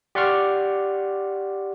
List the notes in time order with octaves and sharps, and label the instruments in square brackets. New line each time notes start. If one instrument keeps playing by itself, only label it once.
[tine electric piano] G4 D5 F#5 C6 C#6 F6